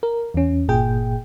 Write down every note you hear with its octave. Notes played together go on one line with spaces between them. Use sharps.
A#4
E2 C#4
G1 A#2 G#4 G5